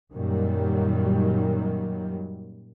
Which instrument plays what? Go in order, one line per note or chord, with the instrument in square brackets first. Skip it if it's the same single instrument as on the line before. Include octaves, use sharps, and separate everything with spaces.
[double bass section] F#2 A#2 D#3 F#3 G3